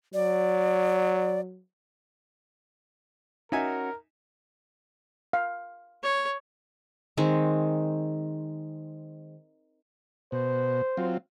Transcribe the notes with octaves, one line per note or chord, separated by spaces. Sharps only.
F#3 D5
C#4 D#4 F#4 A#4 E5 G#5
F5
C#5
D#3 G#3 C4
B2 C5
F#3 C4 F4